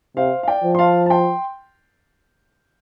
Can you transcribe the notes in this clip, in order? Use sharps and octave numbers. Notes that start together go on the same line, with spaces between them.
C3 C5 F5
F5
D5 G5
F3
C6
F5 A5
A5
G5 C6